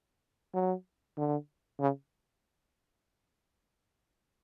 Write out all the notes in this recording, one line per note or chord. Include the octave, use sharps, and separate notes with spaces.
F#3
D3
C#3